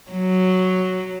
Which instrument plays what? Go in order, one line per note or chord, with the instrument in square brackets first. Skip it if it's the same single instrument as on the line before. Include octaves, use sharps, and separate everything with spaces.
[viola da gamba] F#3